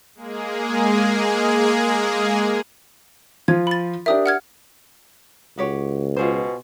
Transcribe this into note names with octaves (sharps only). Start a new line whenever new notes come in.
G#3 A#3 G#4
F3 F4 G#6
B5 A6
D4 G4 A#4 E5 D#6
F#5 F6 G#6
C#2 F#4 G4 C#5
B2 F4 G#4 C5